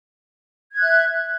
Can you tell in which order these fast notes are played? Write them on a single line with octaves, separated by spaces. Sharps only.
G#6 F#6 E5